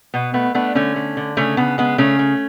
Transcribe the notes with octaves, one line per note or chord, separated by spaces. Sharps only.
B2 B3
A3 B3
A3 B3 D4
D3 A3 C#4
A3
D3
C#3 A3 C#4
C#3 B3
G#3 B3
C#3 A3 C#4
A3